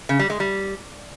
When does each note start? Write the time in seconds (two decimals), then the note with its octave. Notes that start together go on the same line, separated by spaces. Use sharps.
0.09 C#3
0.19 G3
0.30 G#3
0.40 G3